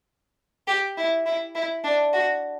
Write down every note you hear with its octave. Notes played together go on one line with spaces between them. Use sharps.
G4
E4
E4
E4
D4
F#4